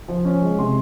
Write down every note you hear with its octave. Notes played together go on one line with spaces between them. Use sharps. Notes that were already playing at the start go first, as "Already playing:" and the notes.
F3
C#4
G#3
C3 C6